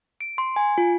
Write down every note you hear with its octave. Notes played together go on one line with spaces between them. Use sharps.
D7
C6
G#5
F4